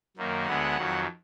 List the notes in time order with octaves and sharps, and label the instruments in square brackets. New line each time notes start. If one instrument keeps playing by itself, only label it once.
[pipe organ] F#2 D#3 A#3
D2 D3 G#3 B3 F#5
F2 D#3 F#3